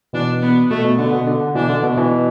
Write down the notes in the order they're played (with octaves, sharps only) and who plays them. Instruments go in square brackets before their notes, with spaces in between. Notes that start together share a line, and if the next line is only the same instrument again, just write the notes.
[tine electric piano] B2 E3 [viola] D4
[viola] B3
[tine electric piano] B2 [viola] A3
[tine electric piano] B2
[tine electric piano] D3 [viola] B3
[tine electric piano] B2
D3
[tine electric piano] B2 E3 [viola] D4
[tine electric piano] D3
B2
B2 E3